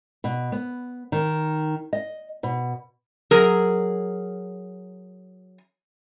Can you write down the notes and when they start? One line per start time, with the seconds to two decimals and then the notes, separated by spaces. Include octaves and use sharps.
0.24 B2
0.52 B3
1.12 D#3
1.93 D#5
2.43 B2
3.31 F#3 G#4 A#4